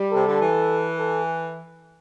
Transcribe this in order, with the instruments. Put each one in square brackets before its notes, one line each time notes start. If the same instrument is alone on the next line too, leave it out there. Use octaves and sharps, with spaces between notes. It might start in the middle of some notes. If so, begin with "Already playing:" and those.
Already playing: [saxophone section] G3
[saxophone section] C3 [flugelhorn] A4
[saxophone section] D3
E3
[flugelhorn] A4